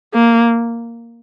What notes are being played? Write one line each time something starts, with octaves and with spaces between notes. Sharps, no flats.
A#3